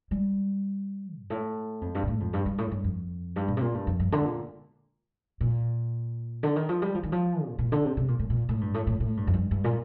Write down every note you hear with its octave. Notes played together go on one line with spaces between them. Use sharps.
G3
G2
A2
F2
G2
A#2
A2
F2
G2
G2
A2
G2
F2
G2
A#2
C3
A#2
G2
F2
G2
D3
A#2
A#2
D3
D#3
F3
G3
F3
D#3
F3
A#2
A#2
D3
C3
C3
A#2
A2
A#2
A2
G2
A2
A2
A2
G2
F2
G2
G2
A#2